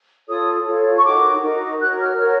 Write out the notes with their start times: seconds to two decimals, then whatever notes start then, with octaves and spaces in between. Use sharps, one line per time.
0.27 F4 A4 C#5 D#6
0.66 F4 A4 C#5
0.98 C#6
1.04 D#4 F#4 A#4 D6
1.42 D#4 F#4 A#4
1.81 F#4 A#4 C#5 F#6
2.00 F6
2.19 F#4 A#4 C#5